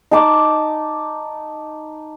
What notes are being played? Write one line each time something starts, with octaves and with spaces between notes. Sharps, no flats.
D#4 A5 D6